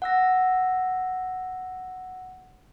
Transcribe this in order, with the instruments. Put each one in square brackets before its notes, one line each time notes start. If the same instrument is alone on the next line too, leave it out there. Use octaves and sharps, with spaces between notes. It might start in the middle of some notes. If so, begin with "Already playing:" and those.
[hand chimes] F#5 E6 A#6